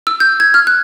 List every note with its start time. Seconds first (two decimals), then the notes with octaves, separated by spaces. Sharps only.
0.07 E6
0.20 G6
0.40 G#6
0.54 F6
0.67 F#6